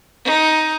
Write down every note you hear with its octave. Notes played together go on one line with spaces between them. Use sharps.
D#4